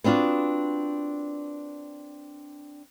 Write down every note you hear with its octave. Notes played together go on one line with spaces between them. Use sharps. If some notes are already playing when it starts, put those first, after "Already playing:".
B3 C4 D4 F4 F#4